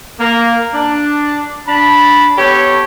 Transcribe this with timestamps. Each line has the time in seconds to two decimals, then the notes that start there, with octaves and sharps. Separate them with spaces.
0.20 A#3
0.74 D4
1.68 D4 A5 B5
2.37 B3 G4 A4 C#5